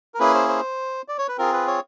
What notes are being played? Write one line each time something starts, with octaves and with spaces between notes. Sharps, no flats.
A#4
A#3 C#4 E4 G#4 B4
C5
C5
D5
C#5
B4
C4 F4 G#4 A#4
B4
C#5